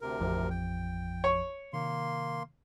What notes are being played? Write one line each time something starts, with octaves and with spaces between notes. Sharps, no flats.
D2 C3 A#4
A1 F2 F3
G5
C#5
C3 D#3 A#3 C6